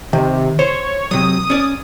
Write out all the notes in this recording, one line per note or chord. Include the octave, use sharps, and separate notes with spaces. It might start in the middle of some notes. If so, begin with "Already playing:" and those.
C3 D#3
C5 C#5
C3 F#3 D#6
C#4 D5